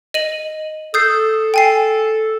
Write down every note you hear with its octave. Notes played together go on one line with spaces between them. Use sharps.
D#5 D#7 F#7
A4 D#6 G6 C7
G5 G#5 C7